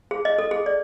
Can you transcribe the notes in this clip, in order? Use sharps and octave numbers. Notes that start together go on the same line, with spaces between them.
G#4
D#5
A4
G#4
D5